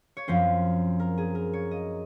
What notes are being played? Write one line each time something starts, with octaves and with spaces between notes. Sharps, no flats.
C#5
F#2 F3 C4 C5
A#4
G#4
A#4
C#5
D#5